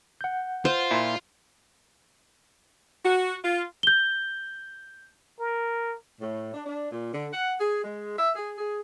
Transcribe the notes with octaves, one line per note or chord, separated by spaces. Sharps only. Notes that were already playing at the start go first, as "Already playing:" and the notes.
F#5 G6
F4 C5
A#2 E4
F#4
F4
G6 G7
A#4
A2
D4
D4
A#2
D3
F#5
G#4
G#3
E5
G#4
G#4